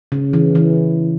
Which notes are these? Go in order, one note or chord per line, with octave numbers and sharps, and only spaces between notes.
C#3
E3
E3